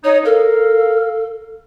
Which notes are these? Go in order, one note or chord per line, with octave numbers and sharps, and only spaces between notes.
D#4 C#5
A4 A#4 F5